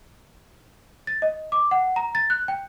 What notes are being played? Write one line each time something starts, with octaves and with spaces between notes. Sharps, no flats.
A6
D#5
D6
F#5
A#5
A6
F#6
G5